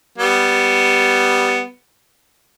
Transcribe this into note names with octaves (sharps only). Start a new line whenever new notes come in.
G3 B3